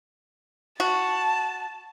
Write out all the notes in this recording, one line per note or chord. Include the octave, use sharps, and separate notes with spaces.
F#4 A5